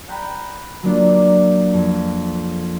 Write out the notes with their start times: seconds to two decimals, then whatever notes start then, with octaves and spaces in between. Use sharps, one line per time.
0.08 F#5 G5 A#5 B5 G6
0.83 F#3 A#3 D4 F4
1.73 F2